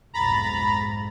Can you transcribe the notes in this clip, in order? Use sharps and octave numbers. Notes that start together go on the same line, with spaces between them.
B1 F2 G#2 A#5 B5 A6